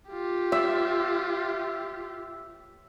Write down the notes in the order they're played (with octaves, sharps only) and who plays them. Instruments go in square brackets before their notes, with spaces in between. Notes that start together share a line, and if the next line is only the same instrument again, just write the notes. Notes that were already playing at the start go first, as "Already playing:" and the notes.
[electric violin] F4 G4
[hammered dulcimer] E5